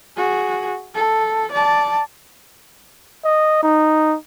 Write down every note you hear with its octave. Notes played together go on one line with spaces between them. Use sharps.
F#4 G#4
A4
D5 A5
D#5
D#4